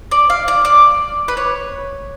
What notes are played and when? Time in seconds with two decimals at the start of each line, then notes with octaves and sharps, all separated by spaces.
0.11 D5
0.30 F5
0.48 D5
0.65 D5
1.28 B4
1.37 C#5